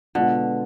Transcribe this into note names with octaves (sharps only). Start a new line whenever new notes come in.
B2 D3 G#3 B3 F4